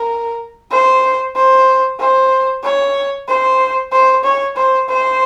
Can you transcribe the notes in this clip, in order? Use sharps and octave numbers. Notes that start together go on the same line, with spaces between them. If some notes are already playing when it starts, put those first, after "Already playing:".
Already playing: A#4
C5
C5
C5
C#5
C5
C5
C#5
C5
C5